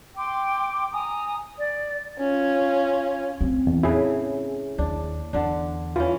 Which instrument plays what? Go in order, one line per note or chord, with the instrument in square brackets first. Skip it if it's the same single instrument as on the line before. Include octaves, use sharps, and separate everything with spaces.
[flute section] G5 C6 D6
G#5 A#5 D#6
D5
[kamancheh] C#4 F4
[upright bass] C4
[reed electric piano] E2
[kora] A2 C#3 [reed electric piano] E4 G#4
[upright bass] D#2 [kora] D4
[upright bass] E2 [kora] D3 D4
[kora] E3 C#4 [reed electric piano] F4